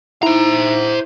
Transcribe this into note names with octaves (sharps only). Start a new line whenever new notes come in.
D#4 E4 C5 A#5